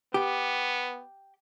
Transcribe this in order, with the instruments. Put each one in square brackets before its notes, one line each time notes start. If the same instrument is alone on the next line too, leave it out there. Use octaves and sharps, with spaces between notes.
[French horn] B3 [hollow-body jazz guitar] G4